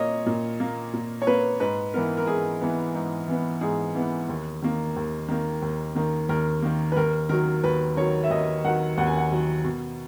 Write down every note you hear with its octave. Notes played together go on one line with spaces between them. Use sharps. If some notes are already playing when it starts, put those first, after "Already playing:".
Already playing: A#2 A#3 C#5 D#5
A#2
A#3
A#2
C#5
A#3 B4
G#2 B4
E3 B3 A#4
A#4
G#2 G#4
E3 B3
G#2
E3 B3
G#2 G#4
E3 B3
D#2
D#3 A#3
D#2
D#3 A#3
D#2
D#3 A#3
D#2 A#4
D#3 A#3
B4
D#2 A#4
D#3 F#3 A#4
D#2 B4
D#3 F#3 C#5
E5
D#2 D#5
D#3 F#3 F#5
D#2 F#5
G#5
F#5
D#3 F#3
B2